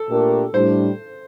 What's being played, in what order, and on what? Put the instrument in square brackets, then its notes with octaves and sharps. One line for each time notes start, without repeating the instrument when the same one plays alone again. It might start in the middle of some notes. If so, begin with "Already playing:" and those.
Already playing: [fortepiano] A4
[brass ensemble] A#2 A3 D4 G4 A#4
[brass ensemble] A2 G3 D4 [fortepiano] C5